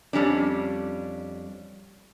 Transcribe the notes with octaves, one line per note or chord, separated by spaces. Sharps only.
F2 G3 C#4 D4